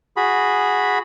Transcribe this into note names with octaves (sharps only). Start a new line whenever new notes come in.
F#4 G#4 B5